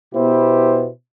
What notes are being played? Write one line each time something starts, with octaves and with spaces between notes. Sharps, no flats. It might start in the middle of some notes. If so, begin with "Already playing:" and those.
B2 B3 E4 G4 C5